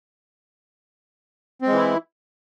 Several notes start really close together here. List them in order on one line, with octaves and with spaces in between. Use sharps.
C4 G#3 E3 E4